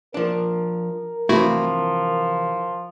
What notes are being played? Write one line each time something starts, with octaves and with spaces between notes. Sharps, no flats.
F3 D4 A#4
C3 E3 F3 A3 E4 F#4